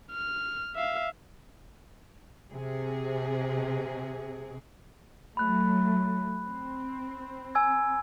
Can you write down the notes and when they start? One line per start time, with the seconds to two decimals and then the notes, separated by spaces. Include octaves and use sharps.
0.12 F6
0.76 E5 F5
2.51 C3 G#4
5.37 F#3 A3 B5 F#6
6.45 C4
7.55 G#5 E6 G#6